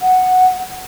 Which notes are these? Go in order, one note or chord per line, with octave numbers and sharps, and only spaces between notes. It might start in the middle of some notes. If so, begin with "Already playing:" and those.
F#5